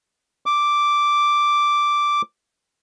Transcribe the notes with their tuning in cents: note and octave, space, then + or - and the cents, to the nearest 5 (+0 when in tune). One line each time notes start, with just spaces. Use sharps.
D6 +0